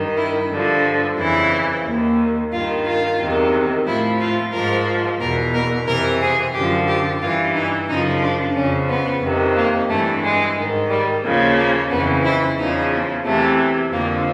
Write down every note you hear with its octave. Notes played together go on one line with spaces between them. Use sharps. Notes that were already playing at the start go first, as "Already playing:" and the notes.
Already playing: G2 D#3
E4
G2 D3 F3
F2 C#3 E3 E4
D#2 D#3
G2 D#3 F4
F4
E2 C3 D#3
A2 F3 E4
F4
G#2 F3 A#4
E2 B2 A#4
A#4
F2 C3 E3 A#4
G#4
F#2 D3 F3 G4
G4
G2 E3 F4
D#4
F#2 C#3 F3 D#4
D4
F2 C#3 F3 C#4
B3
F2 C3 D#3
A#3
G2 E3 A3
G#3
G#2 D#3
G3
D#2 C#3 F3
A#3
F2 C#3 E3 B3
E4
E2 C#3 F3 D#4
E2 C3 E3 A3
F2 D3 F3 A#3